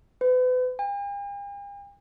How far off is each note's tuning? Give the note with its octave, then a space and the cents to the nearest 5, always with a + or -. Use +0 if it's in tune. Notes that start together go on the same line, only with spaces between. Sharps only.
B4 +35
G5 +45